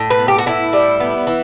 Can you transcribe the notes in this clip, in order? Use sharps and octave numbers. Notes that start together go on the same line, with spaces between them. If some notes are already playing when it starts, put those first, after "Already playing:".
Already playing: A2
B4
B3
G4
F#4
A2 E4
G3
B3
E3